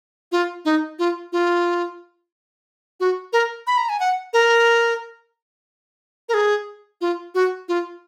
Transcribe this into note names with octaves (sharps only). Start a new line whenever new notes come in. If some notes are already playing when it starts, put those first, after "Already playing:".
F4
D#4
F4
F4
F#4
A#4
B5
A#5
G#5
F#5
A#4
A#4
G#4
F4
F#4
F4